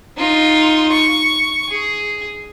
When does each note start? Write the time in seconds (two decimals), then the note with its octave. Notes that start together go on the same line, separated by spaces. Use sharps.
0.17 D#4 F4
0.91 C#6
1.68 G#4